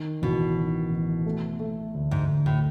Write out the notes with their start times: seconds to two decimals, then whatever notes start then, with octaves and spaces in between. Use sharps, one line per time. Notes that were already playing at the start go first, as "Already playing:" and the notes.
Already playing: D#3
0.22 A1 B2
0.56 D#3
0.91 A1
1.26 A3
1.59 A3
1.94 D2
2.11 G#2
2.28 D2
2.46 A2